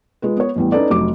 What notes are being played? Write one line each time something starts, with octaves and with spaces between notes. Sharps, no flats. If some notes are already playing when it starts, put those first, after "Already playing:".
G#3 F4 B4
B3 C#5
A1 E2 G3
C#4 D#4 A4 B4 D5
F1 F#3 D6